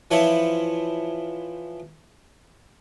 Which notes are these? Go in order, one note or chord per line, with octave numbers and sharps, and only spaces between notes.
E3 F3 E4 C#5